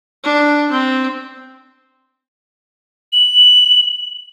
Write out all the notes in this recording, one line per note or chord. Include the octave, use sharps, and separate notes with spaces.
D4
C4
F#7